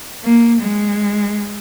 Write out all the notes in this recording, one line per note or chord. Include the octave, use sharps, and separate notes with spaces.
A#3
G#3